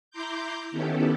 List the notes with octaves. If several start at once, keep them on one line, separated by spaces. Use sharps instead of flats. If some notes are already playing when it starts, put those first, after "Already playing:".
E4 A#5 C6 D6 G6
D#3 B3 C#4 E4 G4 A4